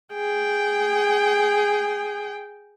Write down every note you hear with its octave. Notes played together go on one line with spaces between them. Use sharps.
G#4 G5